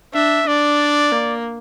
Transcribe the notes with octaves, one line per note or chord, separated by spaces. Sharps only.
D4 E5
D4 D5
A#3